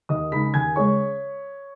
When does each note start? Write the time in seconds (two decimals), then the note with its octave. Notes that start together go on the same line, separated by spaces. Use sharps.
0.09 D#2 D#5 D#6
0.32 C#3 G#3 D#4 B5 B6
0.54 D#2 G#5 G#6
0.76 C#3 G#3 C#5 C#6